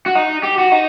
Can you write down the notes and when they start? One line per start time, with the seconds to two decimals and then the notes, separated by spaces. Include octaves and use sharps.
0.06 F#4
0.15 D#4
0.43 G4
0.58 F#4
0.72 D#4